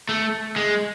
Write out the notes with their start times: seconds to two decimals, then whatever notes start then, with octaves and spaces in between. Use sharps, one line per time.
0.09 A3
0.56 G#3